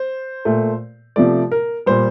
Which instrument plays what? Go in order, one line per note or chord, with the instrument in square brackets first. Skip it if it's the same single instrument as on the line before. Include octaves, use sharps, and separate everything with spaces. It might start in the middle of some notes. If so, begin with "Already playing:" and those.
Already playing: [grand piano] C5
A#2 A3
C3 F3 A3 D5
A#4
A#2 G3 C5